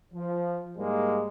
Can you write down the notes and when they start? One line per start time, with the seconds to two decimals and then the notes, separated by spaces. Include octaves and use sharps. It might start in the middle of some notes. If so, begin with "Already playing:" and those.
0.14 F3
0.77 G#2 G3 G#3 A#3